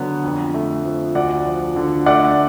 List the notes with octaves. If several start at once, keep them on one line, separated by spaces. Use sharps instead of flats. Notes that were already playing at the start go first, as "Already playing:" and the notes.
Already playing: D3 F#3 B3
F2
A3
F3
D2 D5 F#5
F3
D3
A3 D5 F#5